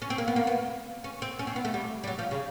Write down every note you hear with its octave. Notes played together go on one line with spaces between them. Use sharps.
C#4
C4
A#3
B3
A#3
B3
C#4
C4
C#4
C4
B3
A3
G3
G3
F#3
F3
C#3